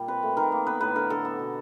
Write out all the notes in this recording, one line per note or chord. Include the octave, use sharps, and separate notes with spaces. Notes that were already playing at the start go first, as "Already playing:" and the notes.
Already playing: A#2 G3
C4 B4
A3
D#3 A#4
A#3
B3 B4
A2 B4
D3 A#4
D3 A4
B3
B2